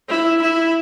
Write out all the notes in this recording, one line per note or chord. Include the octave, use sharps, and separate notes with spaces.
E4
E4